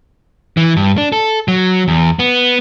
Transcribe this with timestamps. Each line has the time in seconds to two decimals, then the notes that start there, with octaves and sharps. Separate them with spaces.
0.57 E3
0.77 G2
0.98 D4
1.12 A4
1.48 F#3
1.88 E2
2.19 B3